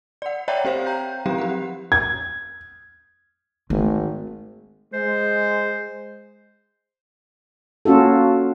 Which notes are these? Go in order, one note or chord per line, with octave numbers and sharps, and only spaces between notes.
D5 F#5
C#5 D5 E5 F#5 G5 A#5
C4 G4 C5 F5
G5 A#5 G6
F3 F#3 C4 G4 F5
G4 F#5
G#6
G#1 A3
G#3 C5
A#3 C#4 F4 F#4 A4